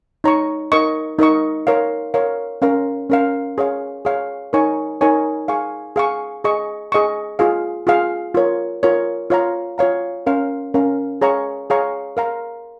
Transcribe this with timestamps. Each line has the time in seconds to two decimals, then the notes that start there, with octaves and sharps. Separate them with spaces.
0.24 D#4 C#5 A#5 C#6
0.72 D#4 A#4 D#5 C#6
1.19 D#4 A#4 D#5 C#6
1.67 A#4 C#5 F5
2.14 A#4 C#5 F5
2.62 C#4 A#4 F5
3.10 C#4 A#4 F5
3.58 G#4 C#5 F5
4.05 G#4 C#5 F5
4.53 D#4 A#4 C#5 G#5 C#6
5.01 D#4 A#4 C#5 G#5 C#6
5.48 G#4 F5 G#5 C#6
5.96 G#4 F5 G#5 C#6
6.44 G#4 D#5 C#6
6.92 G#4 D#5 C#6
7.39 F4 G#4 F5
7.87 F4 G#4 F5
8.35 F4 A#4 C#5
8.83 F4 A#4 C#5
9.30 F4 C#5 F5 A#5
9.78 F4 C#5 F5 A#5
10.26 C#4 A#4 F5
10.74 C#4 A#4 F5
11.21 G#4 C#5 F5 A#5 C#6
11.70 G#4 C#5 F5 A#5 C#6
12.17 A#4 F5 A#5